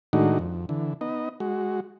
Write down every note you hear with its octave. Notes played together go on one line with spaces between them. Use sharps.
A2 D#3 G#3 D4 D#4 F#4
F2
D3 E3
B3 D#4 D#5
G#3 F#4